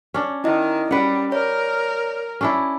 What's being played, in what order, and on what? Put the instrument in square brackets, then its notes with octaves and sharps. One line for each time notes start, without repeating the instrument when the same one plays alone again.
[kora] C#4 D4
[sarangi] D#3 [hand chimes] E4 D#5
[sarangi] G3 [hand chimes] C#4 [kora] B4 F#5
[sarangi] A#4 [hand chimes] C#5 D5
[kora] C#4 D4 E4